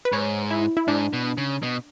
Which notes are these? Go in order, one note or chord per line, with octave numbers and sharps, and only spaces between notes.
B4
G#2 C#5
E4
E4
G#2 D4
B2
C#3
B2